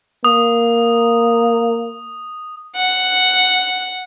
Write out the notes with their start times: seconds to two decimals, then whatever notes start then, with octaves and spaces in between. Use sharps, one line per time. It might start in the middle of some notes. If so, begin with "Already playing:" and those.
0.24 A#3 D#6
2.76 F#5